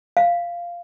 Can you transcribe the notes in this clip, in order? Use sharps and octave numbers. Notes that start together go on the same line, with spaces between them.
F5